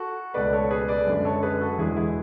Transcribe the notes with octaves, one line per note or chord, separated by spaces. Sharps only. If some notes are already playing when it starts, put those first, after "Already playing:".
Already playing: F#4 A4
C#2 B2 A3 B4 D5
A4 C#5
G#4 B4
B4 D5
F#2 D3 G#3
A4 C#5
G#4 B4
F#4 A4
E1 E2 D3 G#3 E4 G#4
E4 G#4